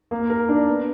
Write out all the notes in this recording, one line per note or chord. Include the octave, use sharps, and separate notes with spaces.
A#3
A#4
D4
B3